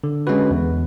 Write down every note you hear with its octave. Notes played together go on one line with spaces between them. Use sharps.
D3
G#3 C#4 F#4 B4
E2